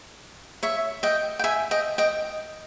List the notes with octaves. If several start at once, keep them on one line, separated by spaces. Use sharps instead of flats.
C#5 E5
D#5 G5
G5
E5 G#5
D#5 G5
D#5 G5